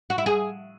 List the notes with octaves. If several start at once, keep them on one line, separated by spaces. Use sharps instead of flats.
F#4
E4
G#4